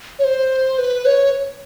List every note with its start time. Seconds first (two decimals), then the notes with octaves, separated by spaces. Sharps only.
0.19 C#5
0.24 C5
0.79 B4
1.06 C#5